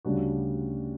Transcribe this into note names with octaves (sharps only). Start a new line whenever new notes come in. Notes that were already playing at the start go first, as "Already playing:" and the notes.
D2 C#3 G3 D4 F#4